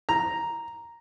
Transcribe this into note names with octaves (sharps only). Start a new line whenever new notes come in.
A#5